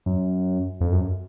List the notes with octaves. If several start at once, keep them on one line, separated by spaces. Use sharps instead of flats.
F#2
F2
F#2